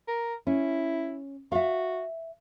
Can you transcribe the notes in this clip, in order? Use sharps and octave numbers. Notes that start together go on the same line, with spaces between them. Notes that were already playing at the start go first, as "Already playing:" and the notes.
A#4
C#4 E4
F#4 E5 F5